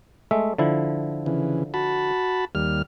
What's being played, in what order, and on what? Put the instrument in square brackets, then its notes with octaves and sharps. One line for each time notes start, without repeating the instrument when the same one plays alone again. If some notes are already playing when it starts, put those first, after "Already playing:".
[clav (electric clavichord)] G#3 A3 E5
D3 F3 E4
[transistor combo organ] C#3 E3
F#4 A5 B5
D#2 G3 F6